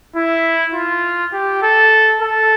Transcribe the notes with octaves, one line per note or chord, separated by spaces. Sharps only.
E4
F4
G4
A4
A4